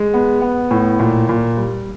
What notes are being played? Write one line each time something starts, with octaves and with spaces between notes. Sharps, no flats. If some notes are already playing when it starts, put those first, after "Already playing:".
Already playing: G#3
B3
B3
A2
A#2
A#2
G3